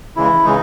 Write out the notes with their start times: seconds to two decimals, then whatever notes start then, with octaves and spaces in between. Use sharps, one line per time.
0.16 C#3 E3 G#3 E4
0.44 C#3 E3 G#3 D#4